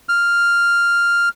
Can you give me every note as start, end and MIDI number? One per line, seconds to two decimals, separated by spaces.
0.09 1.29 89